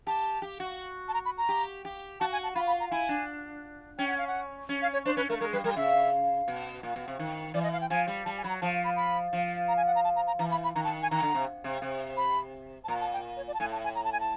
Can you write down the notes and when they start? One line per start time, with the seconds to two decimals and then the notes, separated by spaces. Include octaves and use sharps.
0.07 G4 A5
0.42 G4
0.60 F#4
1.08 A5
1.14 A#5
1.25 B5
1.38 A#5
1.49 G4
1.85 G4
2.20 F#4 A5
2.33 G#5
2.43 A5
2.55 F4 B5
2.67 B5
2.80 A#5
2.91 E4 G#5
3.09 D4
3.98 C#4 G5
4.08 F#5
4.18 F5
4.27 F#5
4.69 C#4
4.82 F5
4.93 C#5
5.05 D4 C5
5.17 C#4 B4
5.29 A3 A#4
5.41 G#3 A#4
5.53 G3 B4
5.64 G3 A#4
5.76 C#3 E5
6.48 B2
6.83 A#2
6.96 B2
7.08 C3
7.19 D#3
7.54 E3 D5
7.63 D#5
7.72 F5
7.81 G5
7.90 F3 G#5
8.08 G3
8.25 G3 A5
8.38 G#5
8.44 F#3 B5
8.49 A#5
8.62 F3 A5
8.85 B5
8.96 B5
9.33 F3
9.68 A#5
9.77 G#5
9.87 F#5
9.95 A#5
10.04 A5
10.16 A#5
10.27 A#5
10.39 E3 A#5
10.51 B5
10.64 B5
10.75 D#3 A#5
10.84 A5
11.02 G#5
11.11 D#3 A#5
11.22 D3
11.34 C3
11.64 C3
11.82 C3
12.17 B5
12.84 A5
12.88 A#2 A#5
13.01 A5
13.13 G5
13.37 C#5
13.48 D5
13.54 A5
13.60 A2 G#5
13.72 A5
13.84 G#5
13.95 A#5
14.04 A5
14.13 G#5
14.20 A5